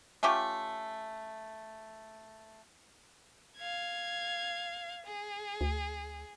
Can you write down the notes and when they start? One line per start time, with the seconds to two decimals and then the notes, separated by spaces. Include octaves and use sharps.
0.23 A3 C#4 F4 G4
3.57 F5 G#6
5.06 G#4
5.61 D2